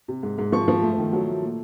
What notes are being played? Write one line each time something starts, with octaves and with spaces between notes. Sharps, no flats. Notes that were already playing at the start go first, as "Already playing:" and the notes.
C3
G#2
G#2
F3 C#6
F3
A3
D#3
F#3
A3
A#2